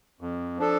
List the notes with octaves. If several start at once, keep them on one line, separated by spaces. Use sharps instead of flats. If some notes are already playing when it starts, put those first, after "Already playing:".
F2
F3 D4 A4